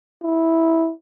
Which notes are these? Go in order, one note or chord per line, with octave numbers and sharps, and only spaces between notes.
E4